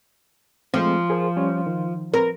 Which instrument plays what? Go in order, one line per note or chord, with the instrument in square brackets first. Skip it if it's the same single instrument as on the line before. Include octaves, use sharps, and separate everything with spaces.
[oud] F3 [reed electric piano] G#3 A3 C4
[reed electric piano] G#4 A#4 C5
G3 C#4 C#5
D#3
[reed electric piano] C4 B4 [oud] A#4